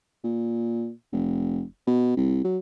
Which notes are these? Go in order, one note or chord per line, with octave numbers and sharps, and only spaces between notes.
A#2
F1
B2
C2
F#3